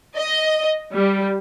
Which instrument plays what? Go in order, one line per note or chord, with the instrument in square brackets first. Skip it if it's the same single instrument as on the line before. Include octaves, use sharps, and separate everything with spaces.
[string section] D#5
G3